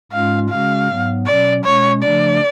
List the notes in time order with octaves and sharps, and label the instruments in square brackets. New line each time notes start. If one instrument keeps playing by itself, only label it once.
[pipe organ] G#2 G#3 C#4 F4 [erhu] F5
[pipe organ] C#3 G#3 C#4 F#4 [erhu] F5
[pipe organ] G#2 F#3 B3
[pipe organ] B2 F#3 C#4 [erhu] D5
[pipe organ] B2 G#3 C#4 [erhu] C#5
[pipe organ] C#3 F3 A3 D4 [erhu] D5